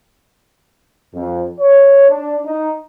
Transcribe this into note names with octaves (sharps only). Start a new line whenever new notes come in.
F2
C#5
D4
D#4